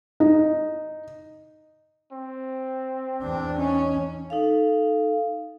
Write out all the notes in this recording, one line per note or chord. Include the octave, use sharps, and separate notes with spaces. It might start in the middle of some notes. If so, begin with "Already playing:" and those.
D#4
C4
E2 D4
C#4 D#4
D#4 A4 F5